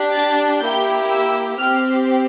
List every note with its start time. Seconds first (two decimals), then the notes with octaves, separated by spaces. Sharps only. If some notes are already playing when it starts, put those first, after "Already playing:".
Already playing: D4 G4
0.13 A6
0.61 A#3 E4 G4 G6
1.09 E6
1.58 C4 G4 F6